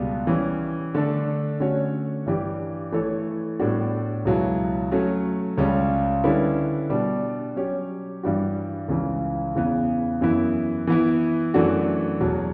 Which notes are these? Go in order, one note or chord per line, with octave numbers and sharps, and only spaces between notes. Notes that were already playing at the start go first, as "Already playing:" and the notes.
Already playing: C#2 B2 G3 B3
E3 G3 C#4
D3 A3 D4 A4
D3 A3 C#4 F#4 C#5
G2 E3 G3 D4 G4
E3 A3 E4 A4 C#5
A2 G3 B3 D4 F#4
C#2 B2 F#3 B3 E4
F#3 A3 C#4
C#2 C#3 G3 C#4
D3 G3 C#4 E4 B4
B2 G3 D4
F#3 C#4 G4 C#5
G2 E3 G3 D4 F#4
C#2 C#3 E3
E2 C#3 E3 B3
F#2 E3 B3 E4
E3 B3 E4
F#2 E3 A3 D4 F#4
E2 B2 F#3